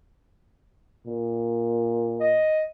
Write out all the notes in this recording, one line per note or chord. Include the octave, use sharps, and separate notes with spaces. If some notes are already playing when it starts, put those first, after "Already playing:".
A#2
D#5